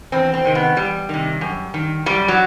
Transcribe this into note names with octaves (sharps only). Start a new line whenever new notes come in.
E2 C4
C4
C3 D#3
B3
E2 G3
C3 D#3
F#2
D#3
F#2 G3
F#3